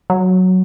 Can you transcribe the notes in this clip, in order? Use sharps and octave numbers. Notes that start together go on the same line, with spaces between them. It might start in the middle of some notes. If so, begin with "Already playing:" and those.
F#3